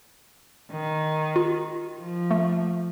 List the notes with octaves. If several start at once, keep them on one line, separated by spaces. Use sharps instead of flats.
D#3
F4
F3
A3